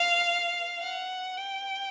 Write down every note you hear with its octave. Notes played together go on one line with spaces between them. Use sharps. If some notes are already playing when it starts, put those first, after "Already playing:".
Already playing: F5
F#5
G5